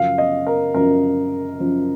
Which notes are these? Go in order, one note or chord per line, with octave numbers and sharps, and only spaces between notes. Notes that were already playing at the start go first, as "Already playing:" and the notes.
Already playing: F#2 C#3 F3 F5
D#5
A#4
F#2 C#3 F3 A#4
F#2 C#3 F3